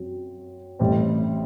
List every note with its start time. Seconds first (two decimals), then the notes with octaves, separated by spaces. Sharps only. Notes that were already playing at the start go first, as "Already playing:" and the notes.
Already playing: F#2 F#3 C4 F#4
0.79 A1 A2 G3 C4